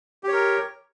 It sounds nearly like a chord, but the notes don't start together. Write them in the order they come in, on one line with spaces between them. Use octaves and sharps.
G4 C#5 A#4